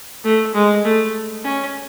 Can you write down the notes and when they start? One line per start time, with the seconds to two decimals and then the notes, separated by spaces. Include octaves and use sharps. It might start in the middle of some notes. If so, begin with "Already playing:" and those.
0.24 A3
0.54 G#3
0.85 A3
1.44 C#4